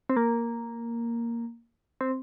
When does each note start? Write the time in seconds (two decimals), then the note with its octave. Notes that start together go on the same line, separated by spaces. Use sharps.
0.09 C4
0.17 A#3
2.01 C4